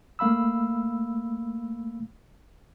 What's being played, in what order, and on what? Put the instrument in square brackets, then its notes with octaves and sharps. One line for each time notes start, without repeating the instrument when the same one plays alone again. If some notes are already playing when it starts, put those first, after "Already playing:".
[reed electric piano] A3 A#3 F5 B5 E6